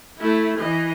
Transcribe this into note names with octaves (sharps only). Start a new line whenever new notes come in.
A3 E4
E3 D#5